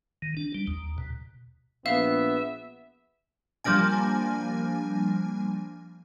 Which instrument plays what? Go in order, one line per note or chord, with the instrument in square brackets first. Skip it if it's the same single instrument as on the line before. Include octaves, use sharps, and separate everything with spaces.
[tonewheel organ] D#3
D4
G3
D#2
B2
[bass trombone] A#1 [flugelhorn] B3 [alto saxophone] E5 [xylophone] F5
[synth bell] F3 G3 A#3 D4 G#5